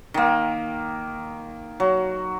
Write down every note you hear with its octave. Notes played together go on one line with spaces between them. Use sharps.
D#3 A#3
F#3